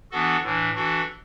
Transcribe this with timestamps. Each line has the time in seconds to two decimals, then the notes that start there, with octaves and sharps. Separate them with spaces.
0.11 E3 B3 D4 F#4 A4
0.43 A2 E3 D4
0.75 E3 D4 F#4 A4